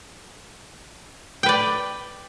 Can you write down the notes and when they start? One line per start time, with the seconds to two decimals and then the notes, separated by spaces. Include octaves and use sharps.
1.43 G5
1.46 B4
1.49 D5